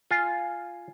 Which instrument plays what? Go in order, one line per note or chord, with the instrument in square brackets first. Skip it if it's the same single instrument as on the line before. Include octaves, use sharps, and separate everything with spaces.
[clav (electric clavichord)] F4 [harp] G#5